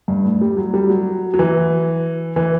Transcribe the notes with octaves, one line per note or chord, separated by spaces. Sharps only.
G2
A2
G3
F#3
G3
F#3
F#3
E3
E3